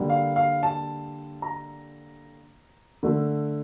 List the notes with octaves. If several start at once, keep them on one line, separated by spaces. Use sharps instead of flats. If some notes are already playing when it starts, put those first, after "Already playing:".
Already playing: D3 G3 A#3
F5
F5
A5
A#5
D3 A3